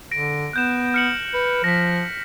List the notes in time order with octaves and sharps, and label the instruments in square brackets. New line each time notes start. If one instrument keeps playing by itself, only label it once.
[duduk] D3 [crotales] A#6 D7
[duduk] B3 [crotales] F#6 G6 E7
[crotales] F6 C#7 F#7
[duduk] B4
[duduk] F3 [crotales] A#6 B6